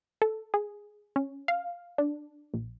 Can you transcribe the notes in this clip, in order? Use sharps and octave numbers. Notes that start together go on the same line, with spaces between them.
A4
G#4
C#4
F5
D4
A#1